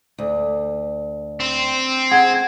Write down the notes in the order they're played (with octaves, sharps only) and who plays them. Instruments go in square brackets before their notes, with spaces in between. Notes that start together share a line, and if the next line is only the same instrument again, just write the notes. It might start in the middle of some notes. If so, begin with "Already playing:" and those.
[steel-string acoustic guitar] D2
[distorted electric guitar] C4
[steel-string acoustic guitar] G#4 [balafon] F#5 [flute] G#6